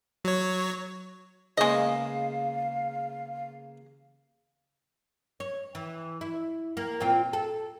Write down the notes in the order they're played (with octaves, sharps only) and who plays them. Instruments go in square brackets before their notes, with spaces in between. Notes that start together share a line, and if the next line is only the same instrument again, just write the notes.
[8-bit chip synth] F#3 C#5
[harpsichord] C#3 A#3 B3 [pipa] G#3 D#5 [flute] F5
[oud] C#5
E3
E4
A#3
A#2 C4 F4
A4